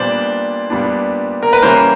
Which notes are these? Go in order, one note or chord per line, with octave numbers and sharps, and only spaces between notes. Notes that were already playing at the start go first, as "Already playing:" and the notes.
Already playing: A#2 G3 B3 D4 C5 D5
A#2 G3 B3 D4
A#4
B4
E3 G3 A#3 C#4 A#4 C5